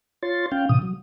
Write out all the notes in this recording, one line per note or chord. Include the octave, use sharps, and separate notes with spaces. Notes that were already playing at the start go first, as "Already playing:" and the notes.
F4 C#5 C6 A6
C#4 F5 G5
A2 C3 E3 D#6
F#3